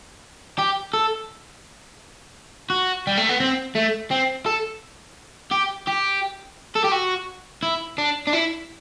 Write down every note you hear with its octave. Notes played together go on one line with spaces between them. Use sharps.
G4
A4
F#4
G3
A3
B3
C4
A3
C4
A4
G4
G4
A4
G4
F#4
E4
D4
D4
E4